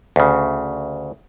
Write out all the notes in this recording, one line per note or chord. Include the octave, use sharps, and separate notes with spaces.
D2 C#3